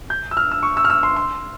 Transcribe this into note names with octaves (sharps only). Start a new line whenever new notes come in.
G6
E6
F6
E6
C#6
E6
F6
E6
C6
C6